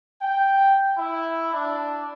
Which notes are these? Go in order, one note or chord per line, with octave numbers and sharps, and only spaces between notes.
G5
E4
D4